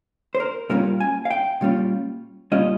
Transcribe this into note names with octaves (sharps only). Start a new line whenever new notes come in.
C5
A#4
A#2 G3 C#4 F4 A#4
G#5
F5
G5
A#2 G3 C#4 F4
A#2 G3 C#4 F4 D#5